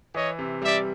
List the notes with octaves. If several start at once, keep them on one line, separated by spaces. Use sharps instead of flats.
E3 C#5 D#5
C3
G3 D5 E5